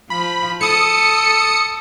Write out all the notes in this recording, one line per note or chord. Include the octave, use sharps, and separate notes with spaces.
F3 B5
A4 D#6 C#7